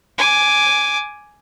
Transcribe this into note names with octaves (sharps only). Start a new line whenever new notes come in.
G#5 D6